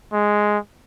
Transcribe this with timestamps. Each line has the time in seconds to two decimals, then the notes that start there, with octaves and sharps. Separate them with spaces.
0.13 G#3